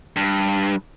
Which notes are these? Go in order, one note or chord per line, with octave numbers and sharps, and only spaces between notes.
G2